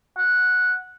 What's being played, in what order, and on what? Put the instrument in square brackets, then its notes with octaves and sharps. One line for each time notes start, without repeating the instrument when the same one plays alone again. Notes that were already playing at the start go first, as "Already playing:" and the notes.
[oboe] F#5